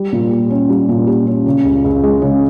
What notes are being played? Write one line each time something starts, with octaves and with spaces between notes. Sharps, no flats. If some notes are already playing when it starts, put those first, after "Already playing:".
Already playing: G3
A#2
G4
C#4
G3
A#2
G4
C#4
C#3
C#2
C#2
G#3
C#3